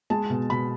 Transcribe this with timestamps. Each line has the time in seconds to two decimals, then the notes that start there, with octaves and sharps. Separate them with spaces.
0.10 G#3 A5
0.30 B2
0.49 B2 B5